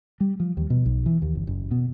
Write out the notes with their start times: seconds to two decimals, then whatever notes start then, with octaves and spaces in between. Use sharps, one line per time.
0.20 G3
0.40 F3
0.57 D#2
0.70 B2
0.86 B1
1.06 E3
1.22 D#2
1.35 F#1
1.47 F#1
1.71 B2